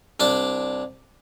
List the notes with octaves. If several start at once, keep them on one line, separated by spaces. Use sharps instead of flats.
C2 D4 D5